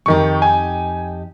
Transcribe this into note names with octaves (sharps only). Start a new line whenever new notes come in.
F2 D#3 D#4 G4 C#6
G#5